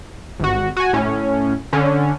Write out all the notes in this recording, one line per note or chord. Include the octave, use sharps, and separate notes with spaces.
G#1 F#4
F#4 G#5
A2 C#4
D3 C#4